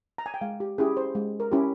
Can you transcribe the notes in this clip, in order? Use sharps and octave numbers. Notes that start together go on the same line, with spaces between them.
A#5
G#5
G5
G#3 F5
G4
C#4 E4 G4 G#4
C5
G#3
A#4
C#4 E4 G4